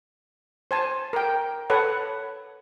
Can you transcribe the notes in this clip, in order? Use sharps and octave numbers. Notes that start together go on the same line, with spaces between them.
C5 G#5 A5
A#4 G5
A4 B4 C#5 F#5